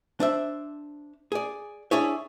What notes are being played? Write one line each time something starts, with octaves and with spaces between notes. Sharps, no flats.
D4 C5 E5
G#4 D5
D4 E4 G#4 C#5